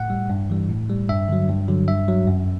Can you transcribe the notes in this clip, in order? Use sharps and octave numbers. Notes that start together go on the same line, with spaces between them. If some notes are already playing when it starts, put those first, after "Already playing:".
Already playing: A2 F#5
G3
G2
E3 G3
A2
G3
G2 E5
D3 F#3
G2
D3 F#3
G2 E5
F#3
F#2